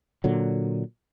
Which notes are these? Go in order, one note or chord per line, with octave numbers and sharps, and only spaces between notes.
A#2 D3 F#3